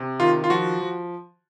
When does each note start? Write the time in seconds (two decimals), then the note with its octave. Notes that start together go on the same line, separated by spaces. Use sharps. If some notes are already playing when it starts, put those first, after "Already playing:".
Already playing: C3
0.20 D#3 F4
0.44 F4
0.50 F3 F#4
0.81 F3